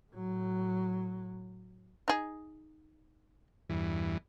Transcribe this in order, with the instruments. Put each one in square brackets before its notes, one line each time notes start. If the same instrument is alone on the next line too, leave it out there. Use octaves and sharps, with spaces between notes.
[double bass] A2 F#3
[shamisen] D#4 G#4
[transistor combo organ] E2 G2 E3